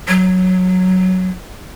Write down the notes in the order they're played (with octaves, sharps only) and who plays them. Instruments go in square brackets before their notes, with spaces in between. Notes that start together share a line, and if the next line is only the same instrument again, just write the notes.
[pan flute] F#3